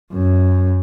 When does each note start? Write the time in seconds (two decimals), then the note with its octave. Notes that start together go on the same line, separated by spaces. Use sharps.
0.12 F#2